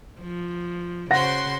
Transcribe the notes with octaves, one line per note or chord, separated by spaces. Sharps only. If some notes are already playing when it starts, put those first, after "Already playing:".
F3
C#3 F#4 C5 F#5 C6 A#6